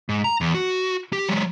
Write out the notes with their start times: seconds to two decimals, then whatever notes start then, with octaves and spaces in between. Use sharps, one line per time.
0.09 G#2
0.24 A#5
0.41 E2
0.55 F#4
1.13 G4
1.29 F#3 G#3